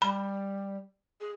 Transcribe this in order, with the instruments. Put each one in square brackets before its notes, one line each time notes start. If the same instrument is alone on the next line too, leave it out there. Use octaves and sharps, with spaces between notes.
[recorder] G3 [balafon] B5
[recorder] G#4